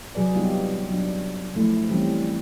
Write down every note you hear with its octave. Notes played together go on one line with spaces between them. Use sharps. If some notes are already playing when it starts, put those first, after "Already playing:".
C3 F#3 G#4 B4 D5
G3 B3 D#4 F4 G4
F#3 D4
F3 A3 E4
E3 G3 C4 C#4